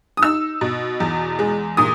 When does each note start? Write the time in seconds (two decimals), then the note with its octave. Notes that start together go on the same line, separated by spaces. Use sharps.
0.17 D#6
0.23 D#4 E6
0.61 B2
1.00 E2
1.39 G#3
1.77 A#2 D#6